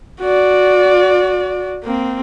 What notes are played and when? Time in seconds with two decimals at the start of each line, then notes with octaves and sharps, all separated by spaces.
0.21 F#4 D5
1.83 A#3 C4